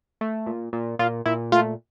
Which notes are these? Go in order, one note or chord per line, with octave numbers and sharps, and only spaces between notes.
A3
A#2
A#2
A#2 F4
A#2 E4
A3 F4